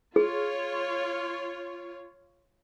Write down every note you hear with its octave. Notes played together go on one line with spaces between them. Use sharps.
F4 G#4 C#5